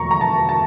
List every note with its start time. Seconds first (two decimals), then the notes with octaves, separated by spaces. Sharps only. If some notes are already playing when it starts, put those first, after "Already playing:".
Already playing: E1 D2 D3 F3 A#5 C#6
0.11 A#5
0.21 A5
0.49 A5